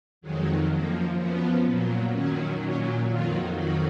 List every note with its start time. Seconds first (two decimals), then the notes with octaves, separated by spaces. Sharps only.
0.21 F2 D#3 F#3 G#3
0.70 F#2 F3 A#3
1.17 F#2 F3 B3
1.64 A#2 F#3
2.12 F#2 D#3 F#3 C#4
2.60 A#2 F#3 C#4
3.08 F2 D#3 F#3 F4
3.55 F2 D#3 F#3 F#4